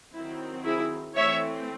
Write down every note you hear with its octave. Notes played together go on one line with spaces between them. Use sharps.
D#3 F#3 C4 E4
E4 G#4
E3 A3 C4 C#5 E5